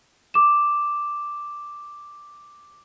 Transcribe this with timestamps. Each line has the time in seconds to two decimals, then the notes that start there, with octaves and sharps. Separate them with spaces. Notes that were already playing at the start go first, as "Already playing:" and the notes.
0.34 D6 E7